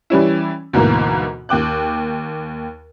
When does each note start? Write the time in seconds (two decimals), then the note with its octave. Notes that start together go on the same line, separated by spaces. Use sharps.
0.10 E3 G3 C#4 E4
0.73 D2 G#2 B2 E3 A#3
1.49 D#2 G5 D6 F#6